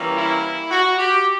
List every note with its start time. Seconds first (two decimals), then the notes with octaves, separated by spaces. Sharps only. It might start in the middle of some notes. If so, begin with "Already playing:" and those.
Already playing: E3 G3 A#3 C#4
0.14 E4
0.71 F#4
0.98 G4